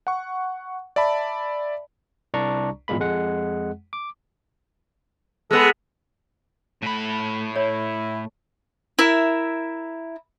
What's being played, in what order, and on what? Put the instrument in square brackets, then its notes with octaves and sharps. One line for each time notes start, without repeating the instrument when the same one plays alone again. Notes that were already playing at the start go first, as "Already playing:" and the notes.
[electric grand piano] F#5 C#6
D5 E5 A5 B5
[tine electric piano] C2 D4 D5 A#5 C#6
G#1 E2 A#2 G#3 A#3 B5
F2 G#3 F#5
D6
[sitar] G#3 B3 [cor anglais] A4
[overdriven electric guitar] A2 B5 [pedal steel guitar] A3 F#5
[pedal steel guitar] A3 [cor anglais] E4 [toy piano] C#5
[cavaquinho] E4 A#4 E5